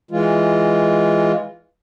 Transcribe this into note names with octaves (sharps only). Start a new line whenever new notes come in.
E3 G#3 F4